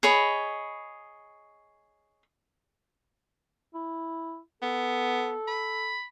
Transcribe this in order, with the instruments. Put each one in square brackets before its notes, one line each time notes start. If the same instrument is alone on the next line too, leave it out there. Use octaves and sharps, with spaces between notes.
[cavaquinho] G#4 C#5 D#5 B5
[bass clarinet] E4
[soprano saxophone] B3 [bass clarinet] A4
[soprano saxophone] B5